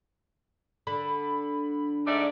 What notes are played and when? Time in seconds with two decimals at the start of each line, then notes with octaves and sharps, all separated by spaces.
0.87 D3 B5
2.07 G#2 A3 D5